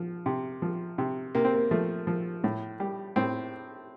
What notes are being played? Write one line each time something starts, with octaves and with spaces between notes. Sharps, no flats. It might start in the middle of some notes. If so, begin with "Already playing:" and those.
Already playing: F3
C3
F3
C3
C3 A#3
C4
A#3
F3 A3
F3
A2
G3
A2 C4